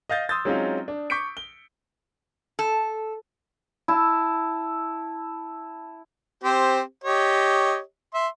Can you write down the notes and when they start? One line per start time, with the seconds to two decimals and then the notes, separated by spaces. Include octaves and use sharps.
0.09 D#5 F5 G6 A6
0.29 C6 D#6 E6 G6 A6
0.45 F#3 G#3 C4 C#4 D#4 F4
0.88 D4
1.10 C#6 D6 G6 B6 C#7 D7
1.37 G7
2.59 A4
3.88 E4 A5
6.44 C4 G4 C5
7.04 G4 C#5 D#5
8.14 E5 C6